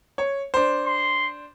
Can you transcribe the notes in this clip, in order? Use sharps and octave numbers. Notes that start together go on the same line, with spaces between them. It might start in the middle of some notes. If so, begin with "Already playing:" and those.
C#5
D4 C5
C6